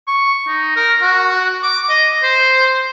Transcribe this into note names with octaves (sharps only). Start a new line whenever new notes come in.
C#6
D#4
A#4
F#4
D6
D#5
C5